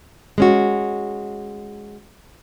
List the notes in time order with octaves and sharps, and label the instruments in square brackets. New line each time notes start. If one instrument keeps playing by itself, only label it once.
[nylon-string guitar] G#3 C#4 F#4